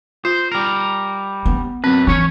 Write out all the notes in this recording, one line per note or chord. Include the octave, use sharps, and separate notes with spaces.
F4 C5
G3 A#4
B3
F#2 C4 B4
E3 C#4 C#5